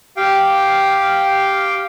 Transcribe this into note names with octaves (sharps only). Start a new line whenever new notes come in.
G4 F5 G5